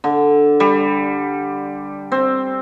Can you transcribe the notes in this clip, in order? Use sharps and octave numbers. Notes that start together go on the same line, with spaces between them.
D3
G3
C4